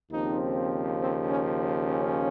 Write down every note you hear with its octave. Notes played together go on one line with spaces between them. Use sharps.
D#2 C#3 F3 C4 D#4
C4
C#4
C#4